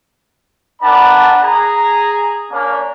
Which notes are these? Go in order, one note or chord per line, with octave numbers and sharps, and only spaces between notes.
D4 A#4 D5 F#5 A5 B5
G#4 A#5
A#3 C#4 D4